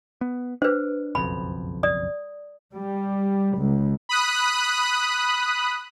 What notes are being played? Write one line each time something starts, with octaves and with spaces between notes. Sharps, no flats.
B3
D4 B4 C5
F#1 B1 F2 B5
D5 D#6
G3
C#2
B5 D#6 F#6